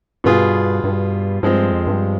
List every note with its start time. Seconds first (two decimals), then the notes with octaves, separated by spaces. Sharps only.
0.24 G2 B2 B3 F4 G#4
0.84 G2
1.43 G2 F3 G#3 C4
1.72 F2
1.87 G2